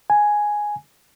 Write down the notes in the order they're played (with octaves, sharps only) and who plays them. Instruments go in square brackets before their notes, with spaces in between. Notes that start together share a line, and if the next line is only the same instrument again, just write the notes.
[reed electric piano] G#5